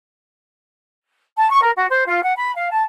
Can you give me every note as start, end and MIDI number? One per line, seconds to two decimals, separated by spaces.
1.37 1.49 81
1.50 1.62 85
1.62 1.71 70
1.76 1.87 66
1.90 2.03 72
2.07 2.21 65
2.23 2.34 78
2.37 2.53 83
2.55 2.70 77
2.71 2.83 81